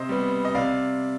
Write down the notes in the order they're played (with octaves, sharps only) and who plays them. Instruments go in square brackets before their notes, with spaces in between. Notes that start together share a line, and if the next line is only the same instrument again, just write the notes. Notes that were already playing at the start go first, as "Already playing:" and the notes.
Already playing: [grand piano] C3 C5 D#5
G3 B3
D#5
C3 D5 F5